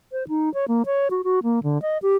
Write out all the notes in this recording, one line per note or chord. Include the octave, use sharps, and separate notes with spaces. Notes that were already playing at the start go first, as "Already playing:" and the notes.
C5
D#4
C#5
A#3
C#5
F#4
F#4
A#3
D3
D#5
G4